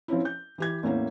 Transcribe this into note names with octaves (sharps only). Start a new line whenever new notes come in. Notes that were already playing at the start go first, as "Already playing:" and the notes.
F3 C4 C#4 E4
G6
E3 G4 G#6
E2 A2 A#3 C#4